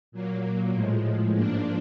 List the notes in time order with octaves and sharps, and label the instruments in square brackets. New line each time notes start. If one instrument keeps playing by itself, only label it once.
[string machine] A#2 F#3 A#3
A2 F3 G#3
G#2 F3 A#3 D4